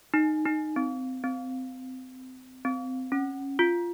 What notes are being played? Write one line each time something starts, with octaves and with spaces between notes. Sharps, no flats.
D#4
D#4
C4
C4
C4
C#4
F4